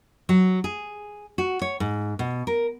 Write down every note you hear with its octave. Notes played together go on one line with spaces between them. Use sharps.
F#3
G#4
F#4
C#5
G#2
B2
A#4